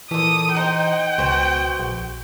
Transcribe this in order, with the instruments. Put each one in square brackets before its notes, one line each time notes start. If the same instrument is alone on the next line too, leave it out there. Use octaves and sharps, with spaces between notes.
[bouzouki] A#2 A4 [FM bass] E3 [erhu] D#6
[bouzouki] D4 D#4 C5 [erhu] G5
[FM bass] C#2 [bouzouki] B2 F#4 C5
[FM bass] A#1